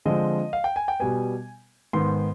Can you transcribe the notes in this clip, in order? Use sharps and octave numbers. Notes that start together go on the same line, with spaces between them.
D3 F3 G#3 C4 D#5
F5
G5
G#5
G5
B2 G3 B3 G#5
G#2 D#3 B3 C6